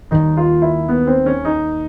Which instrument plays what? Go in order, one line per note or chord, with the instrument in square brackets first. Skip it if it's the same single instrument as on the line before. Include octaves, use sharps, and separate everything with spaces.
[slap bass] D#2 D#3 G3 [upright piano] D#4
[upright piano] F4
E4
B3
C4
C#4
D#4